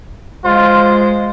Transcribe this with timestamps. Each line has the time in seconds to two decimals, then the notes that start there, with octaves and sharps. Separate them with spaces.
0.44 G#3 F4 C5